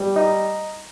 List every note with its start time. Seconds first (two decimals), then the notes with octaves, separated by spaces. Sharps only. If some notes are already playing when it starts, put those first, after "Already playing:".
Already playing: G3
0.16 D#4